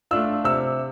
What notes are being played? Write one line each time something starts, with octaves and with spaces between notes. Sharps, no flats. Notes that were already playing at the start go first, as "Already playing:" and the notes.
A3 D4 F4 E6
C3 E6